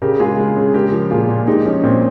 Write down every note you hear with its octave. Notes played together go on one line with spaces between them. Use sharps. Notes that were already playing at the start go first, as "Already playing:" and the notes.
C#3 G4 A#4
G#3 F4 G#4
G#3
C#3
G#3 G4 A#4
F3
A#2 F4 G#4
A#2
G#3 D#4 G4
F3 C#4
A#2 C4